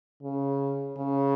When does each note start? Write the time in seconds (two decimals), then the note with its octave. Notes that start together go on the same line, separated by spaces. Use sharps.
0.23 C#3
0.98 C#3